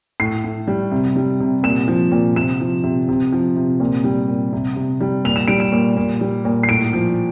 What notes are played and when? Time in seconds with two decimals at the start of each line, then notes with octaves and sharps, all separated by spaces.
0.20 A2 C7
0.44 A2
0.67 G3
0.91 C3
1.16 G3
1.40 C3
1.63 A#2 E7
1.88 F3
2.12 A#2
2.36 C3 E7
2.60 F3
2.84 C3
3.09 C3
3.32 F3
3.56 C3
3.80 A#2
4.04 G3
4.28 A#2
4.53 C3
4.76 C3
5.00 G3
5.25 A#2 F7
5.36 E7
5.48 G3 D7
5.60 E7
5.72 A#2
5.97 A#2
6.21 G3
6.45 A#2
6.63 C7
6.69 A2 D7
6.93 F3